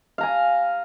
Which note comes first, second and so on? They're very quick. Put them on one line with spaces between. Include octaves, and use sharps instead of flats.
F5 A#5 G#5